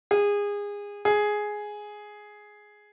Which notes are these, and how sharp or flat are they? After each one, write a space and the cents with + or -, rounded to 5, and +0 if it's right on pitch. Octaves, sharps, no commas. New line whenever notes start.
G#4 -25
G#4 +5